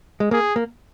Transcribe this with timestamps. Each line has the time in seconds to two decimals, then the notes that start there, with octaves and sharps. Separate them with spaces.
0.20 G#3
0.31 A#3 G#4
0.56 A#3